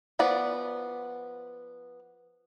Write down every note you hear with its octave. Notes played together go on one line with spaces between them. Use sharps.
F3 B3 D5